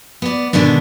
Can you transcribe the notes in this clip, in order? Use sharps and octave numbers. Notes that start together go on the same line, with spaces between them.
B3 D5
B2 D3 D#3 G#3 B3 D4